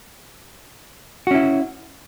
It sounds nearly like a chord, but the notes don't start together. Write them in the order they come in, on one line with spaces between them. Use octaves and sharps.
F#4 C#4 E4